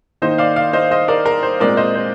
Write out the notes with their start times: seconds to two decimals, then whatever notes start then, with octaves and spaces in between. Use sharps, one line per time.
0.22 D#3 A#3 D#4 C5 D#5
0.38 D5 F5
0.56 D5 F5
0.73 C5 D#5
0.91 C5 D#5
1.08 A#4 D5
1.26 A#4
1.43 C5
1.60 A#2 G#3 C4 A#4 D5
1.77 C5 D#5
1.95 C5